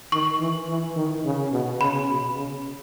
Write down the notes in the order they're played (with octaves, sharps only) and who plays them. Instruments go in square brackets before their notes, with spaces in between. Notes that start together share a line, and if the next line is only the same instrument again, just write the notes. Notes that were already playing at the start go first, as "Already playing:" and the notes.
[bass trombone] D#3 [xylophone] C#6
[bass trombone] E3
E3
D#3
C#3
B2
[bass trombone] C#3 [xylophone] B5
[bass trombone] B2
C#3